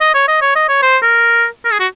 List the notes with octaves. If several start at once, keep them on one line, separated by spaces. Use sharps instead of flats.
D#5
C#5
D#5
C#5
D#5
C#5
C5
A#4
A#4
G#4
F#4